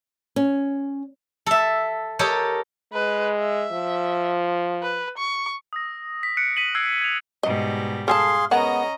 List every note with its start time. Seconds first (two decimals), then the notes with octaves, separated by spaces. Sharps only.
0.36 C#4
1.46 A4 E5
2.19 G4 A4 A#4 C#5 D#5
2.93 G#3 B4
3.39 E5
3.72 F3
4.83 B4
5.18 C#6
5.73 D#6 E6 A#6
6.23 B6
6.37 F#6 B6 C#7 D7
6.57 B6 D#7 F#7
6.75 E6 F#6 G#6 C7 D7
7.01 G#6 F7
7.43 G#2 B2 G3 D#5
8.08 G#4 A4 F5 G#5 A5 C6
8.51 G#3 B3 C#4 A#4 D#5 F#5 A#5